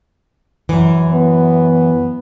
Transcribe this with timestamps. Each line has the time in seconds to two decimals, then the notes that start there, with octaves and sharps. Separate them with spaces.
0.69 F#2 E3
1.13 B3